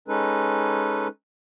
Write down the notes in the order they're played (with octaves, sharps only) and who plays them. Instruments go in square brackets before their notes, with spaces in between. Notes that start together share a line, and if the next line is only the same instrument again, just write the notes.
[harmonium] G#3 C#4 D#4 A4 B4